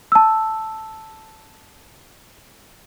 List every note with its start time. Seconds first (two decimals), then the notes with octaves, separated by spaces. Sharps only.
0.12 A5 E6